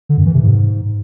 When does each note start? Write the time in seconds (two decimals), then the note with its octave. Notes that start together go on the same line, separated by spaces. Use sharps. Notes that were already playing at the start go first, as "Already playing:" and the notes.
0.09 D3
0.18 F#2
0.26 E3
0.34 C3
0.42 G#2